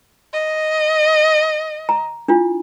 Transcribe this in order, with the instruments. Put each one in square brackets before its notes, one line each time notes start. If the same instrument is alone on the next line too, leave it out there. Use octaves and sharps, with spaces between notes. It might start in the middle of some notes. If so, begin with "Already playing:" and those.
[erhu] D#5
[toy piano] A#5
D4 E4 F4